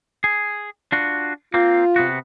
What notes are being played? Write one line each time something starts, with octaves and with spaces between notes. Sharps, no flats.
G#4
D4 F4 F#4
A#3 C4 F4
C3 B3 F#4